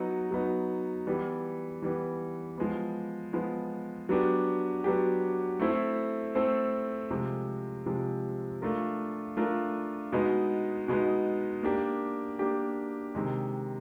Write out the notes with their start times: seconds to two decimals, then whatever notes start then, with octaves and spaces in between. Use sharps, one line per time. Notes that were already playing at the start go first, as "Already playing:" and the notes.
Already playing: F#3 B3 D#4
0.31 F#3 B3 D#4
1.07 E3 G3 B3
1.82 E3 G3 B3
2.58 F3 G#3 B3
3.33 F3 G#3 B3
4.09 F#3 B3 D4 G4
4.84 F#3 B3 D4 G4
5.59 A3 C4 E4 A4 C5
6.35 A3 C4 E4 A4 C5
7.11 C3 F3 G#3
7.86 C3 F3 G#3
8.62 A3 D4 F4 A#4
9.37 A3 D4 F4 A#4
10.12 B2 G#3 B3 D#4
10.88 B2 G#3 B3 D#4
11.63 A#3 D4 G4
12.39 A#3 D4 G4
13.15 C3 D#3 G#3